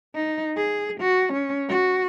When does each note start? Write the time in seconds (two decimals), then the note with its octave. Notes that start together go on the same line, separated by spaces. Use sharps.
0.15 D#4
0.57 G#4
1.01 F#4
1.33 C#4
1.69 F#4